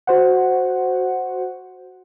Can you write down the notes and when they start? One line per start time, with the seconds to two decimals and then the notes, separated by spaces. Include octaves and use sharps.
0.07 F#4 C5 F#5